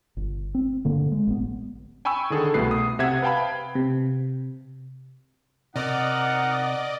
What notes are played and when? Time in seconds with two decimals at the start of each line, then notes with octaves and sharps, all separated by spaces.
0.17 G1
0.55 C4
0.85 G2 D3 A#3
1.12 G#3
1.27 A1 B3
2.05 G5 G#5 B5 C#6 E6
2.30 D3 D#3 G#4 A4
2.54 C2 B2 A3 B4 C7
2.71 D#6
2.99 C3 E5 F#5 G#6
3.22 B4 F5 G5 A5 B5
3.75 C3
5.76 C3 D#4 A#4 C5 D5 D#5 F#5